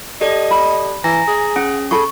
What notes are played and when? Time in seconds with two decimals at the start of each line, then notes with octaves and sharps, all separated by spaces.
0.21 G4 A4 D5 D#5
0.51 B5
1.04 E3 G#5 A#5 A#6
1.28 G#4
1.56 C#4 F#5
1.91 G#4 A4 B5 C#6